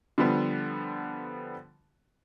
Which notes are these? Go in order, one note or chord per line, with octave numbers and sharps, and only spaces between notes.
D3 F3 G3 B3